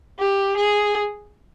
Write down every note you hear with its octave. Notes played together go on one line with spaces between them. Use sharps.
G4
G#4